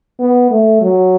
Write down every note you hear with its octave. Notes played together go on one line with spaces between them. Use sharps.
B3
A3
F#3